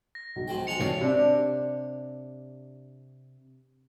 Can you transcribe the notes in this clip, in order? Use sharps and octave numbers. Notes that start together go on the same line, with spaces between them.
A#6
B1
G#2 F3 G5
F3 G#3 A5 C#7 F7
G#2 C3 E3 C#5 D5 F5
C3 D4